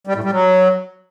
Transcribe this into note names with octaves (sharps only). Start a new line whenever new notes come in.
G3
A2
G3
F#3